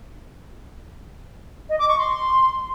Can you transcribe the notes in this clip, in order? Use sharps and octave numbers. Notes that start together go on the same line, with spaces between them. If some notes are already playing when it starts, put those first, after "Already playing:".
D#5
D6
C#6
C6